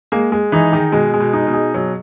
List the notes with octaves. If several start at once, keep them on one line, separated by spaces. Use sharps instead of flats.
G#3 A#3
G#3
E3 D#4
D#3 G#4
B2 G#3
G#3
B2
D#4
B2
G#4
B2 F#3